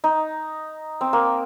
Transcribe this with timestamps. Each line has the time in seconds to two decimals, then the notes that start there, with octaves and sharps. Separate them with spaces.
0.04 D#4
1.01 C4
1.13 A#3